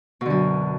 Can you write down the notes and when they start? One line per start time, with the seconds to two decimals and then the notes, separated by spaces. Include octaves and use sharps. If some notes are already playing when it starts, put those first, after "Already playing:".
0.21 B2
0.26 D3
0.30 F#2